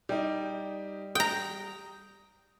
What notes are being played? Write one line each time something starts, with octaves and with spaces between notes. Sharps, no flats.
G3 D#4 G4
G5 A#5 D#6